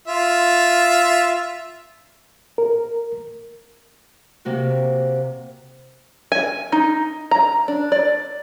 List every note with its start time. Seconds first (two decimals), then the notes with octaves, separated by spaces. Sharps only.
0.07 F4 E5
2.58 A#4
4.45 C3 A#3 F#4
6.32 G#5
6.72 D#4
7.31 A#5
7.68 D4
7.92 D5